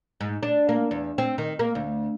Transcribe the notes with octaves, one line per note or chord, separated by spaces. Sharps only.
G#2
D4
A#3
E2
C4
D#3
A#3
D2